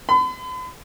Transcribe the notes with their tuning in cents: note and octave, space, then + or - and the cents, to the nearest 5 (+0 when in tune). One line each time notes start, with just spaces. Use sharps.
B5 +45